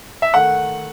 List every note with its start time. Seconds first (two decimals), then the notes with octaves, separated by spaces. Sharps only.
0.22 E5
0.34 D#3 A3 F#5